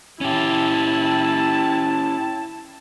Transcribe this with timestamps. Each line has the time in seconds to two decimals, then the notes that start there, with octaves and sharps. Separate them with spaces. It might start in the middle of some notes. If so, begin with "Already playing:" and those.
0.21 C#4 E4 G4 A5